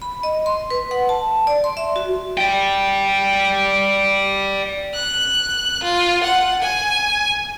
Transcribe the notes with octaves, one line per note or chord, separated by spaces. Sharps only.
B5
D#5
C6
B4
F#5
A5
D5
C6
E5
F#4
D5 G5
F#6
F4
F#5
G#5